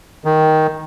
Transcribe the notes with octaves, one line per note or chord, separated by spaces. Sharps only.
D#3